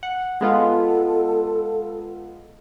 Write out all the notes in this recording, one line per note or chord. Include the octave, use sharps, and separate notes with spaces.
F#5
G#3 B3 F4 A4